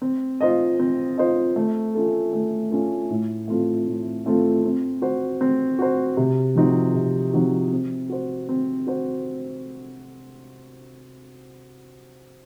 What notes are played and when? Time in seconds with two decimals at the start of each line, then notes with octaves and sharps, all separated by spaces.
0.02 C4
0.41 F4 C5 D#5
0.79 C4
1.18 F4 C5 D#5
1.56 A3
1.95 C#4 F4 A4
2.33 A3
2.71 C#4 F4 A4
3.10 A2
3.48 A3 C4 F4 A4
3.87 A2
4.26 A3 C4 F4 A4
4.64 C4
5.02 F#4 C5
5.41 C4
5.79 F#4 C5
6.17 C3
6.56 F3 C4 D#4 F#4
6.94 C3
7.33 F3 C4 D#4 F#4
7.72 C4
8.09 F#4 C5
8.49 C4
8.87 F#4 C5